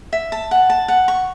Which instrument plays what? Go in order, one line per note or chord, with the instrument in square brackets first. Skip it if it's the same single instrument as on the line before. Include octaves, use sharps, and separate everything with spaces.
[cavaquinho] E5
A5
F#5
A5
F#5
C#6